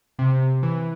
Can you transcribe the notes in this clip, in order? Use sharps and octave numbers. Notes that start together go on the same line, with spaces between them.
C3
E3